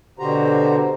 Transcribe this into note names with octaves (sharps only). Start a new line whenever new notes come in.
B2 D3 F#4 G4 C5 A#5